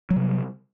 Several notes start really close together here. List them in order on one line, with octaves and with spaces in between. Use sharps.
F#3 G3 C3